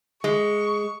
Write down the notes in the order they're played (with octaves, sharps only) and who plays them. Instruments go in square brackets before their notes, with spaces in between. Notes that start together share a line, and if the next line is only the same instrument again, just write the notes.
[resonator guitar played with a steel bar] G#3 [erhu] C#6